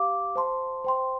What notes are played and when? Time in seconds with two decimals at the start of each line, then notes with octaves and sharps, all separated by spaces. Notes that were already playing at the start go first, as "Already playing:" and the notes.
Already playing: G4 F5 D6
0.36 C5 A5 C6
0.85 C5 G5 C6